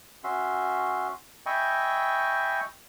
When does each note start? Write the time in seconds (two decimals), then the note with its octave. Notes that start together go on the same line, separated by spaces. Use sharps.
0.24 C#4 F#4 E5 C6
1.46 D#5 E5 G5 G#5 B5 C#6